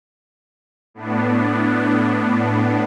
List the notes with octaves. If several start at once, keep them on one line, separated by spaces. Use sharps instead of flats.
A2 B3 D4